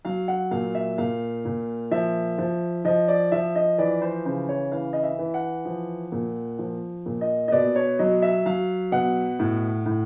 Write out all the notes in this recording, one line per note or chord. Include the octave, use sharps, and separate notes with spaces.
F#3 F5
F#5
A#2 F5
E5
A#2 F5
A#2
F3 E5
F3
F3 D#5
D5
F3 E5
D#5
E3 D5
C5
C#3 C5
C#5
E3 F5
D#5
E5
E3
F#5
F3
A#2
F3
A#2
D#5
D#5
B2 D5
C#5
F#3 D#5
E5
F#3 F5
B2 F#5
A2
A2